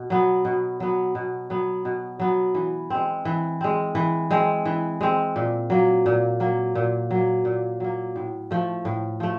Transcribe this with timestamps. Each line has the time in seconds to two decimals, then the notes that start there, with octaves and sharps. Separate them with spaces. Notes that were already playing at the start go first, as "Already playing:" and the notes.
Already playing: B2
0.10 F#3 B3
0.45 B2
0.80 F#3 B3
1.15 B2
1.50 F#3 B3
1.85 B2
2.20 F#3 B3
2.55 E3
2.90 G#3 C4
3.25 E3
3.61 G#3 C4
3.95 E3
4.30 G#3 C4
4.65 E3
5.01 G#3 C4
5.36 A#2
5.70 F#3 A#3
6.06 A#2
6.40 F#3 A#3
6.75 A#2
7.11 F#3 A#3
7.45 A#2
7.80 F#3 A#3
8.16 A2
8.51 F3 A3
8.85 A2
9.20 F3 A3